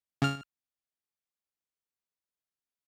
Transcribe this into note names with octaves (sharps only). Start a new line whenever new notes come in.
C#3 F6